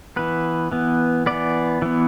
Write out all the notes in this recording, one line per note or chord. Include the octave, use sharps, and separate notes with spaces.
E3 B3 B4
E3 B3
E3 B3 D5
E3 B3